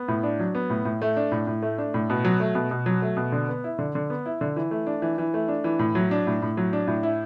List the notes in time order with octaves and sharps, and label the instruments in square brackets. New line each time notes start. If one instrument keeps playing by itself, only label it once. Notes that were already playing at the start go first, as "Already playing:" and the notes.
Already playing: [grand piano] B3
A2
D4
F#3
B3
A2
A2
A3
D4
A2
A2
A3
D4
A2
B2
F#3
A3
B2
B2
F#3
A3
B2
D3
B3
E4
D3
D3
B3
E4
D3
E3
A3
D4
E3
E3
A3
D4
E3
A2
F#3
D4
A2
A2
F#3
D4
A2
E4